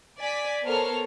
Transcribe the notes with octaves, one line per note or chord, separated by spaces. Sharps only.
D5 G#5 B6
B3 A4 A#4 C5 C#5 F6